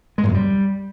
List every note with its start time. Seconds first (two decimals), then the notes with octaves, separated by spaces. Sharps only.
0.18 G#3
0.23 A#2
0.29 F#2
0.34 G3